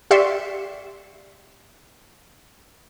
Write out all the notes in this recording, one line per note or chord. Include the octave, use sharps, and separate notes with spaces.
G4 D5 E5 C6 C#6